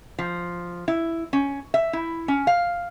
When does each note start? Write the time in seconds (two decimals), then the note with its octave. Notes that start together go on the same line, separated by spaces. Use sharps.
0.19 F3
0.88 E4
1.33 C#4
1.74 E5
1.93 E4
2.28 C#4
2.47 F5